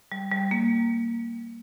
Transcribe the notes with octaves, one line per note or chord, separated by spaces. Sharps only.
G3
G3
A#3